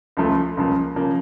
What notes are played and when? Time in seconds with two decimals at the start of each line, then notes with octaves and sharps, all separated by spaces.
0.17 C#2 C#3 F3 A3
0.57 C#2 C#3 F3 A#3
0.96 C#3 F3 A#3